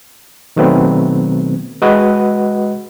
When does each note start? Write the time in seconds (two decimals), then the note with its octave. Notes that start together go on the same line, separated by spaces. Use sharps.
0.56 B2 D#3 F#3 A3 B3 C4
1.82 G#3 F#4 B4 D#5 F#5